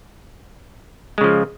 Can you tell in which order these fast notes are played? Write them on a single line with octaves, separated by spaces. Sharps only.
G#3 C#3 F3